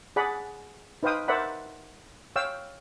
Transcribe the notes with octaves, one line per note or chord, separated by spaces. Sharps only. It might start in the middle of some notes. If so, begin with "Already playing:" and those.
G#4 D5 F#5 B5
D#4 B4 C5 F5 G5 D#6
A#4 C5 D5 E5 F#5 B5
C#5 F5 G5 E6